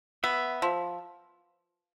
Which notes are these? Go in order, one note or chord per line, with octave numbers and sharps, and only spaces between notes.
B3 E5
F3